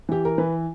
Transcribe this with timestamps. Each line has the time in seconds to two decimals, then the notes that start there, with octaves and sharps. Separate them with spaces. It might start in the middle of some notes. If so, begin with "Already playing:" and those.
0.09 E3 G4
0.25 A#4
0.38 E3 B4